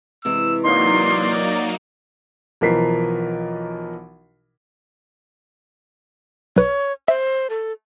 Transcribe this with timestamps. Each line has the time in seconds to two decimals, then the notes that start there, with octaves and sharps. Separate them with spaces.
0.25 C3 E3 G#3 E6
0.63 F#3 A#3 D#4 D5 C6
2.61 B1 E3 F3 A#4 B6 C7
6.56 B1 B4 C#5
7.08 C5 E5
7.50 A4